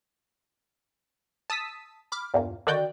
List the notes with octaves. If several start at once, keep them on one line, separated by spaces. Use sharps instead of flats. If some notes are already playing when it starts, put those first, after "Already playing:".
A5 D#6 E6 B6
B5 D6 F6
E2 G2 A#2
D3 D#3 F#4 D5 G5 G6